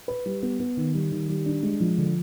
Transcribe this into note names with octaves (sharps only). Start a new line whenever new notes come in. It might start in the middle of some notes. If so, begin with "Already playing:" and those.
B4
G3
B3
B3
D#3
G3
D#3
G3
D4
G#3
F3
D3